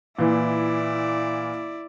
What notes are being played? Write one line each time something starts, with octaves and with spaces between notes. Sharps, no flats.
A#2 E3 E4 D5